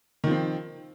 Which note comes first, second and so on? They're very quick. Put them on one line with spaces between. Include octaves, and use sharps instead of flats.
D#3 F3 C4